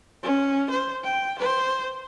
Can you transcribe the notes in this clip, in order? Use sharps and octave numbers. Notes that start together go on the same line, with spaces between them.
C#4
C5
G5
C5